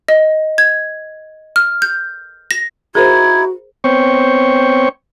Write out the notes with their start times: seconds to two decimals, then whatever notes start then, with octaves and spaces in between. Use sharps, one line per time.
0.08 D#5
0.58 G#6
1.56 F6
1.82 G6
2.51 A#6
2.95 D#4 E4 F#4 G#4 A#4 C5 G#6
3.84 B3 C4 C5 C#5 G5 C#6